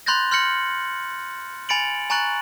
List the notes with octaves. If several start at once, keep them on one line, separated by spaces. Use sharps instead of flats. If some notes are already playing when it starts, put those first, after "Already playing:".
B5 C6 F#6 G6 A6 A#6
C6 F6 G6 A#6 C#7 F#7
G#5 B5 A6 C#7 D7 F#7
G#5 A#5 C#6 F#6 A6 F#7